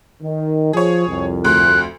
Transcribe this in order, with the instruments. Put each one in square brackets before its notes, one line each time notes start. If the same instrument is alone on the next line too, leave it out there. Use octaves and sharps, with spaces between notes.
[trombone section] D#3
[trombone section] F3 [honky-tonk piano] G#4 C#5
[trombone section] C2 F2
[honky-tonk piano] D2 C6 [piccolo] F#6